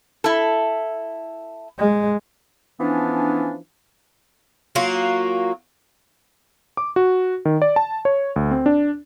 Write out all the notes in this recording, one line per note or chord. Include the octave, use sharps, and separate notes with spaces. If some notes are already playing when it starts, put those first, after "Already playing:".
E4 A4
G#3
E3 F3 B3 C#4 D4
F#3 A#3 F4 F#4
D6
F#4
D#3
D5
A5
C#5
D2
C4
D4